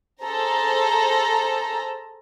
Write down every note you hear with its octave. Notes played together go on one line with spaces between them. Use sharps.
G#4 A4 C5 A#5